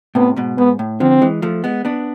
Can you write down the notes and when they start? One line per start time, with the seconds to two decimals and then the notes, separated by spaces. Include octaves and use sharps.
0.15 A2 C3 B3
0.36 G#2 B2
0.58 G#2 B3
0.79 A2
1.00 D3 F3 C4
1.21 E3 G#3
1.42 F3 A3
1.64 G#3 B3
1.85 B3 D4